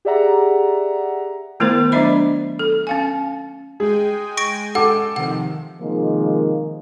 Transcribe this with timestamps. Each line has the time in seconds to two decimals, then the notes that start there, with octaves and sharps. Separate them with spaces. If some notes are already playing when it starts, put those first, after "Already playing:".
0.05 G4 G#4 D5 E5 F#5 A#5
1.60 D#3 A3 B3 E4 A#4 C5
1.92 F#3 D4 C5 D#5 E5 B5
2.59 A4
2.87 C#4 F5 G#5
3.80 G#3 G#4 G5 G#5
4.37 C#6 A#6 D7
4.75 A4 F#5 D6
5.16 C3 D#3 F3 F#5
5.81 C3 D#3 F3 G#3 A#3